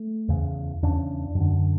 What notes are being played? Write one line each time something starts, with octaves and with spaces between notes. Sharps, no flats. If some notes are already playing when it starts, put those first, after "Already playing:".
Already playing: A3
E2 C#3
E2 C#3 D4
F#2
D3